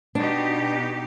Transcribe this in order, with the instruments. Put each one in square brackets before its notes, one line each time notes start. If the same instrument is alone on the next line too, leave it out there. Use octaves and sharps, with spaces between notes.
[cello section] B2 D#4 G4 [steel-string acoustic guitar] D4